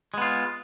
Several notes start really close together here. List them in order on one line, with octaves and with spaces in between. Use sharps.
G#3 B3 F4